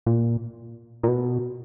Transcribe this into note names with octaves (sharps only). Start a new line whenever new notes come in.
A#2
A#2
B2